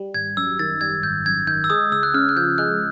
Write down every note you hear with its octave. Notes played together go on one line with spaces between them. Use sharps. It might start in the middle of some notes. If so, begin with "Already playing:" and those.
Already playing: G3
G#1 G#6
F#2 E6
D#3 A6
G3 G#6
G#1 G6
F#2 G#6
D#3 G6
E6
G#3 D#6
C#2 E6
F#6
C#3 F6
F#6
F3 G6
G#3 F#6